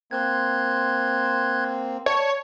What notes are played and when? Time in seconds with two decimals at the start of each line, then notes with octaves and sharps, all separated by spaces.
0.11 A#3 C4 C6 F#6 G#6
2.06 C#5 D5 A5